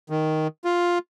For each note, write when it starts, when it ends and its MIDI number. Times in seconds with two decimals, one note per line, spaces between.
0.10 0.47 51
0.65 0.98 65